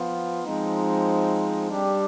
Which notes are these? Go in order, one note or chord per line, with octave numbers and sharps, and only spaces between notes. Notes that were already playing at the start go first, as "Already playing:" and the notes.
Already playing: F3 B3 F4
F3 G#3 C4 D#4
G3 D4 G4